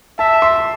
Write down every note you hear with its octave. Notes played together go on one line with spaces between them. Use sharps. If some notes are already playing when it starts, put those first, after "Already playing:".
E5 A5
C6